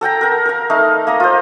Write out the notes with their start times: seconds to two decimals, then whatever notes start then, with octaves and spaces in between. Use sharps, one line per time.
0.01 A4 F#5 G5 A#5
0.21 A#4 F#5
0.45 A#4 F5
0.70 A3 D#4 F5
1.07 A#3 D#5 A#5
1.20 F4 C5